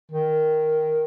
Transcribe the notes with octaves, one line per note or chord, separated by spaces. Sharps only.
D#3